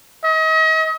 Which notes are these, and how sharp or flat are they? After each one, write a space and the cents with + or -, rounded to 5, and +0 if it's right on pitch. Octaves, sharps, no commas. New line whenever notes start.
D#5 +35